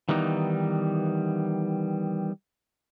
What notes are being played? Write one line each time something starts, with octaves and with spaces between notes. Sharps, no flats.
D#3 E3 G3 B3 D#4